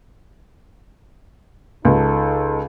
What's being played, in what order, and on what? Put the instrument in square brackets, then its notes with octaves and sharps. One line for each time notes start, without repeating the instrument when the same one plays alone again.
[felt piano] C#2 [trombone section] D#4 A4